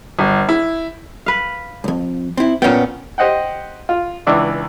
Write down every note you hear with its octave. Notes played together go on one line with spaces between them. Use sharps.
G1
E4
B4 F5
B1 F2
C4 E4
A#2 B3 C#4 F5 G5
G4 C5 D#5 F#5 G5
F4
C#2 E3 D4 D5 D6 E6